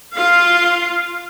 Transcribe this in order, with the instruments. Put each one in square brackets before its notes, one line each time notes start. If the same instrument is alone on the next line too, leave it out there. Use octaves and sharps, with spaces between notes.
[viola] F4 F5